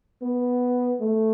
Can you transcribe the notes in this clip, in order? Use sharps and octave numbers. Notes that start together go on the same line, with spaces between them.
B3
A3